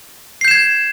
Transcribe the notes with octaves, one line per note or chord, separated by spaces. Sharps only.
G6 G#6 C7 E7